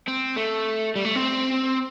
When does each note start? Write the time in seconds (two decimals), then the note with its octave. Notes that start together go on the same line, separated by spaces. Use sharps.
0.08 C4
0.36 A3
0.96 G3
1.05 A3
1.15 C4